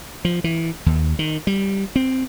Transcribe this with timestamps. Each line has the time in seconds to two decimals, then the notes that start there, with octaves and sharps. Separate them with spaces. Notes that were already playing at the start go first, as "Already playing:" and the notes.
0.25 F3
0.44 E3
0.86 D#2
1.19 D#3
1.47 G3
1.96 C4